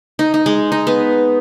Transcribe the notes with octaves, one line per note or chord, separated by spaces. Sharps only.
D#4
D#4
G#3
D#4
B3